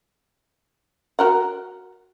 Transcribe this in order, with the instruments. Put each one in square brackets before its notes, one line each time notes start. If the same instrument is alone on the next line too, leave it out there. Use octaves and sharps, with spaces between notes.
[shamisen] F#4 A#4 F#5